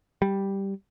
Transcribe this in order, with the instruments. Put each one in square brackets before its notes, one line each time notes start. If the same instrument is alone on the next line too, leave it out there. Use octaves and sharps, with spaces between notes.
[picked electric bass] G3